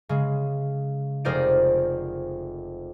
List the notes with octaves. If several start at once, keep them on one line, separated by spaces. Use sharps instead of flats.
C#3 G#3
F1 G#4 A#4 C5 D5 D7